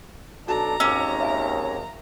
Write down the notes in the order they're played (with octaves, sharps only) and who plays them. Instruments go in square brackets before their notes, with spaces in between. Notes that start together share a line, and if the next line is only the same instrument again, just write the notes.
[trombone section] B1 D4 A4 [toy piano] F#4 [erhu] A#5
[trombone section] G#1 D#2 [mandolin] C#4 [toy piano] D6 E6
[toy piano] E5 F5 G#5